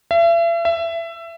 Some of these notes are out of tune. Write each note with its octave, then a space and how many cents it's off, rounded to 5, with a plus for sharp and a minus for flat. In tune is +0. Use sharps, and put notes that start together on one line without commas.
E5 +40
E5 +20